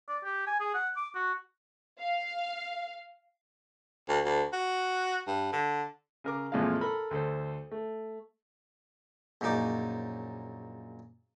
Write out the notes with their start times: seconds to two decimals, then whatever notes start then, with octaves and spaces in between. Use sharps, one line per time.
0.09 D5
0.24 G4
0.47 G#5
0.60 G#4
0.74 F#5
0.97 D6
1.15 F#4
2.01 F5
4.08 D2
4.24 D2
4.53 F#4
5.27 G2
5.53 D3
6.24 C#3 A#4 D6
6.52 A1 F2 A#2 F3 G#3 F5
6.81 A4 A#4 B5
7.11 D2 A4 C5
7.71 A3
9.41 A#1 F#2 C#3 D#4 D6